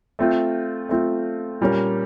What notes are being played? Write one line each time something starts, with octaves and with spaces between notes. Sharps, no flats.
A3 C4 F4
A3 C4 F4
A#2 G3 A#3 C#4